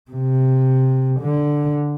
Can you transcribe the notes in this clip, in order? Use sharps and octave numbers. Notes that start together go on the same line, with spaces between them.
C3
D3